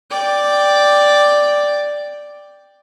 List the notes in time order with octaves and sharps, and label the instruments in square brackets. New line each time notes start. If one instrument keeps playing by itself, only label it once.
[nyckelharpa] D5 G5